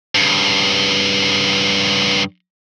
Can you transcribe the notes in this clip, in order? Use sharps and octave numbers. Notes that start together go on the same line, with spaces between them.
G2 C#3